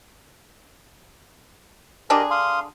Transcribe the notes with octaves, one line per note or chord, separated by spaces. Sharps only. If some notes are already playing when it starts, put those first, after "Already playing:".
D3 D4 G4 G#4 A#4 D#5
F5 C6 D#6